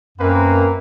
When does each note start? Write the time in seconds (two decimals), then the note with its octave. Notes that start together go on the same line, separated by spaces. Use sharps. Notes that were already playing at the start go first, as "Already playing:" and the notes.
0.18 F#2 A#3 C4 B4